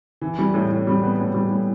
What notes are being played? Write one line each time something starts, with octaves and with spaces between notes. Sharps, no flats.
E3
G3
A2
A2
G3
B3
A2
G3
A2